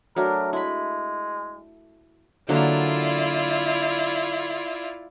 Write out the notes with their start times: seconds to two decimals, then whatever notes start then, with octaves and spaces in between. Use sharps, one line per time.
0.16 F#3 A3 D4 A#4
0.53 G#3 E4 B5
2.49 D3 F#3 A#3 E4 F4 D5